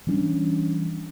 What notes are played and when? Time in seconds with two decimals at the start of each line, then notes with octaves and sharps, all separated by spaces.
0.07 E3 G3 C#4 D4